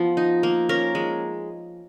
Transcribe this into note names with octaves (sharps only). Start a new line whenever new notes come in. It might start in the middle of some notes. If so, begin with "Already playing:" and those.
Already playing: F3 B3
D#4
A#3
C#4 A#4
G#3